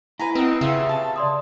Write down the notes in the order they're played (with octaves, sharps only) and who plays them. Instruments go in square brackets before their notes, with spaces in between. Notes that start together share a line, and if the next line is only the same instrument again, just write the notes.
[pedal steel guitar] E4 [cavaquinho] B4 G#5 A#5
[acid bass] C4 [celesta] B4 [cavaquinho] D#5 F#5
[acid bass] C#3 [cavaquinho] F4 G4 E5 [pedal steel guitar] E6
[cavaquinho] A5
[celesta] D5 C6 D#6